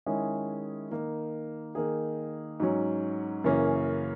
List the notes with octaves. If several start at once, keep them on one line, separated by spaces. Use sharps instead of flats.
D#3 G#3 C#4 E4 G#4
D#3 A#3 D#4
D#3 A#3 D#4 G#4
G#2 F#3 C#4
F#2 C#3 E3 A#3 C#4